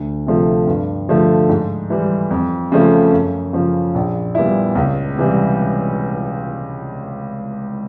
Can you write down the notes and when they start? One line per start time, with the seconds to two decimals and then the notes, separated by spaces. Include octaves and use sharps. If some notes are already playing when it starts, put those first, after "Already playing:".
Already playing: D2
0.26 C3 F3 A3
0.67 G2
1.09 D3 F3 A3
1.49 G#2
1.90 E3 G3
2.30 F2
2.72 C#3 F3 A3
3.12 F#2
3.53 C#3 F3
3.95 A#1
4.35 A#2 G3 B3 E4
4.75 C#2
5.17 C3 E3 G3